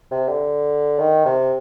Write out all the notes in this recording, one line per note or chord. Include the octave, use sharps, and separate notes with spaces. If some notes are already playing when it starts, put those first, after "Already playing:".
C3
D3
D#3
C3